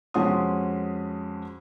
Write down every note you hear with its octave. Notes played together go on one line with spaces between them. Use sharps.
F2 G#3 C#4 F#4 C6 D#6